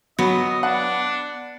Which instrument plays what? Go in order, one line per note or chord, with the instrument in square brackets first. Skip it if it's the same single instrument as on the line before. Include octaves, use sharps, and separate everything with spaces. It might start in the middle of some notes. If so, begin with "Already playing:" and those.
[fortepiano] F#3 [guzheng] B3 [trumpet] D#5
[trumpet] D4 [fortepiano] F#5